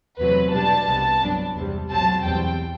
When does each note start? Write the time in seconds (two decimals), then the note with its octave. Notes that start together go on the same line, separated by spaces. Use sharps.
0.19 E2 C3 F#3 A3 B4
0.53 B2 G3 D4 A5
0.87 C2 C3 G3 B3
1.21 G1 G2 F#3 B3 D4
1.56 E2 C3 G3
1.91 B1 A2 F#3 C4 A5
2.24 E2 B2 G3 C4 G5